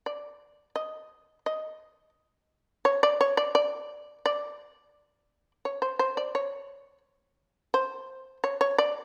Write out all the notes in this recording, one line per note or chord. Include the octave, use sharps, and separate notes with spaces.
D5
D#5
D#5
C#5
D5
C#5
D5
D5
D5
C#5
C5
C5
D5
C#5
C5
C#5
C#5
D5